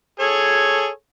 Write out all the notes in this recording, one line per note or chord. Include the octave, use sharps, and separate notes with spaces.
G#4 A4 C#5